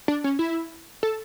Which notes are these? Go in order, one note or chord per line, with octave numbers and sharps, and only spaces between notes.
D4
C#4
E4
A4